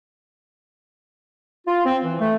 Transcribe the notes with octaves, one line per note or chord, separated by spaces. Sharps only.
F4
C4
E3
A3